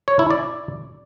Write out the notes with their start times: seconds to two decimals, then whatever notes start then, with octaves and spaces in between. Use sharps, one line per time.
0.08 C#5
0.19 E4
0.30 D5